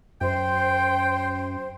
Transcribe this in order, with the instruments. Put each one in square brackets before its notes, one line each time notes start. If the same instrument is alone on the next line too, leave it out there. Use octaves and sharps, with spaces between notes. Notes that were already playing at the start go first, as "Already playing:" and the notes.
[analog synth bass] F#2 [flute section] C5 [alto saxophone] G5